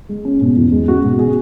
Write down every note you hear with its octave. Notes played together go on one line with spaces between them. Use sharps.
G#3
C#4
B2
E2
G#3
C#4 F#4
B2
G#4